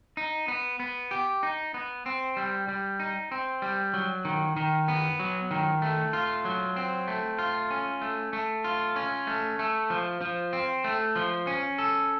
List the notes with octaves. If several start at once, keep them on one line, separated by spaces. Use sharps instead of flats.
D#4
B3
B3
G4
D#4
B3
C4
G3
G3
D#4
C4
G3
F#3
D#3
D#3
B3
F#3
D#3
A3
F4
F#3
C4
A3
F4
C#4
A3
A3
F4
C#4
A3
A3
F3
F3
C4
A3
F3
C#4
A4